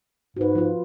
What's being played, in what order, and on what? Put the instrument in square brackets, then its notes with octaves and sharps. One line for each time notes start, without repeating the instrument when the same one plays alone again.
[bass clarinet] G#2 [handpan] F#4 B4
[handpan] F3 F4